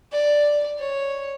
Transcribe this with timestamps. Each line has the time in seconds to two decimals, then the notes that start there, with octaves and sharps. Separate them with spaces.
0.12 D5
0.79 C#5